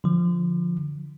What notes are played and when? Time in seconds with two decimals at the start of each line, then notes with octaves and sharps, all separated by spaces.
0.04 D3 F3